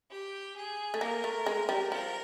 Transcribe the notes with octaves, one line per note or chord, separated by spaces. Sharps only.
G4
G#4
A3
A#3 A#4
A3
G#3
G3
F3 A#4